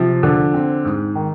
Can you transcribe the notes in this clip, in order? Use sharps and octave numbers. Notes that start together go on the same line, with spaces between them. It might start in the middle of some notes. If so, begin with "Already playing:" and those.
Already playing: C3 F3
D3
C4
G#2
D#3